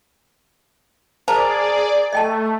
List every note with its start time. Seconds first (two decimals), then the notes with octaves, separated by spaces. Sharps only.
1.28 G#4 A#4 C5 D5 F5 A5
2.13 A3 D#5 G5 A5